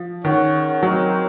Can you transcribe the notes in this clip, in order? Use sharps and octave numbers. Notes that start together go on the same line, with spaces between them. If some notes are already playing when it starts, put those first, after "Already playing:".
Already playing: F3
D#3 C#4 G#4 C#5 F#5
F#3 C4 D#4 F#4 A#4 C#5